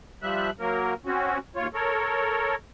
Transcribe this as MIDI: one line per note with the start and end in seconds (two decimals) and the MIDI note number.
0.22 0.50 53
0.22 0.50 55
0.22 0.50 76
0.22 0.50 90
0.60 0.94 54
0.60 0.94 58
0.60 0.94 70
1.06 1.38 60
1.06 1.38 61
1.06 1.38 66
1.56 1.67 39
1.56 1.67 65
1.56 1.67 73
1.74 2.55 69
1.74 2.55 70
1.74 2.55 73